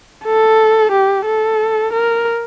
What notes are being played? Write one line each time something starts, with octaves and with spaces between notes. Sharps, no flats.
A4
G4
A4
A#4